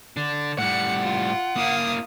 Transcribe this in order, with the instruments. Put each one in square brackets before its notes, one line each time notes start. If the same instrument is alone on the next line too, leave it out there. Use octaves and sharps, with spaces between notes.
[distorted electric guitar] D3 D4
[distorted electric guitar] A2 G3 [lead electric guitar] F#5 [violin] C#7
[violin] F4
[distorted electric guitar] A#3 E4 [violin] F5 D#6